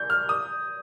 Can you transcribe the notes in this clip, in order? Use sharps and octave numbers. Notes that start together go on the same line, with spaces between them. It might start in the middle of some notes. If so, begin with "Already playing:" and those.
Already playing: G6
F6
D#6